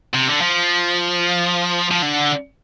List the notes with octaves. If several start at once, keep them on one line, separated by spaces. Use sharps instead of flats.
C3
D3
F3
F3
D3